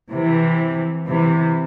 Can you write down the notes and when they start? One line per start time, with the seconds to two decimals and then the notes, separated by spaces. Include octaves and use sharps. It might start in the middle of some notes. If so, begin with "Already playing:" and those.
0.10 C3 E3
1.07 C3 E3